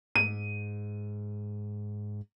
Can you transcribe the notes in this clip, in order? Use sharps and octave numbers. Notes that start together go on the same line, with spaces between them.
G#2 D#7